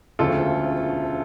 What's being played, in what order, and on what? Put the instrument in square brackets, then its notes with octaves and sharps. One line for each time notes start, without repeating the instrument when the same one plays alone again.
[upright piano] E1 D2 C#3 F3 A3 F4 A4